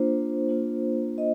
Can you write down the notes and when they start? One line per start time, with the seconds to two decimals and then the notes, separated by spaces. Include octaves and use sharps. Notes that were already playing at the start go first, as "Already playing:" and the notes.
Already playing: A#3 D4 F4 C5
0.49 A#3 D4 F4
1.18 D#5